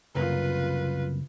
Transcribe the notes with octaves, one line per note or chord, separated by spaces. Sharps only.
C2 F#2 C#3 A#3 F4 B4